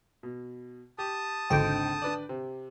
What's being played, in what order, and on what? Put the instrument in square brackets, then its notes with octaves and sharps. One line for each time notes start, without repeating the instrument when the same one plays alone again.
[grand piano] B2
[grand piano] G4 [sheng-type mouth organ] A5 D#6
[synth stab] G#1 D3 G5 [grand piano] C#2 C4 D#4
[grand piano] D4 B4 D5
C3